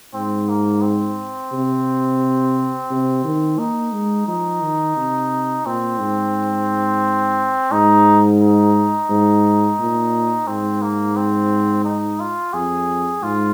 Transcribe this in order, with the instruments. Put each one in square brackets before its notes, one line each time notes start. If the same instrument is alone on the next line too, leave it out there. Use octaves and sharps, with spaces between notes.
[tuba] G#2 [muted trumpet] C4
[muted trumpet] A#3
C4
[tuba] C3
C3
D#3
[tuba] A#3 [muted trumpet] D#4
[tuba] G#3
[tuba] F3 [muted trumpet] D#4
[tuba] D#3
C3
[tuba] A#2 [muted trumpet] C4
[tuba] G#2
[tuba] G#2 [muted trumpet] D#4
[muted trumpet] D#4
[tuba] G#2
A#2
[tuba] G#2 [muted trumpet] C4
[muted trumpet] A#3
C4
D#4
F4
[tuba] F2 [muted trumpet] G#4
[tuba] G#2 [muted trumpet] F4